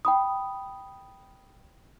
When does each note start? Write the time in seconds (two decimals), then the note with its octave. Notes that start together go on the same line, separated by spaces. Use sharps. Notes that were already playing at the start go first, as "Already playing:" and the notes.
0.05 G5 B5 D#6